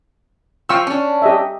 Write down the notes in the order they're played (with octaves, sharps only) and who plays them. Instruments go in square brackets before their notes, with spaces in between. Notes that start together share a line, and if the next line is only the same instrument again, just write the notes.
[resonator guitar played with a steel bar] F3 F4 [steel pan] G5 C#6 E6
[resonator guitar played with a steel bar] C#4 D4
[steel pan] G4 D#5 E5